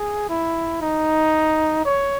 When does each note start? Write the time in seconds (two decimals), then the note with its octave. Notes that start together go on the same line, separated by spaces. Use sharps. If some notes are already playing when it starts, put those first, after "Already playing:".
Already playing: G#4
0.29 E4
0.82 D#4
1.85 C#5